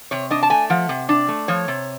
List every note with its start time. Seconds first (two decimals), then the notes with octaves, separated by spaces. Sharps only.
0.11 C3 C#5
0.30 D4 D#5
0.43 A5
0.50 A3 G#5
0.70 F3 F#5
0.89 C3
1.09 D4
1.28 A3
1.48 F3 C#5
1.68 C3